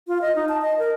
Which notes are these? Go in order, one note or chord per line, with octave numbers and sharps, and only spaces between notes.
F4
D#5
D#4
A5
D#5
A#4